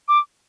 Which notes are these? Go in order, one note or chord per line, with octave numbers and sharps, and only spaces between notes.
D6